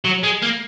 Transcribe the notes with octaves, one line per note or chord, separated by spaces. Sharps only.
F#3
G#3
A#3